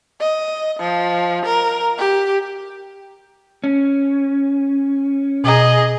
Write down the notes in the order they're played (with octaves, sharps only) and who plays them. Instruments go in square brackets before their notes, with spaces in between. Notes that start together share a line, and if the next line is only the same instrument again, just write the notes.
[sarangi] D#5
F3
A#4
G4
[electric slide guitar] C#4
[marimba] B2 A#5 [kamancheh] G#4 D#5